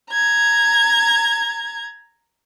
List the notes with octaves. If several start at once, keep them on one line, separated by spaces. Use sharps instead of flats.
A#5 G#6